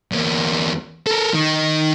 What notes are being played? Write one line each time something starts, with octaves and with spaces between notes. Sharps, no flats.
E2 A#3
A4 A#4
D#3 D#4